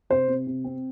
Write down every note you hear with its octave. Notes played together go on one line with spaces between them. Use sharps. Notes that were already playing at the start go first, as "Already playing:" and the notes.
C3 C5
C3
C3
C4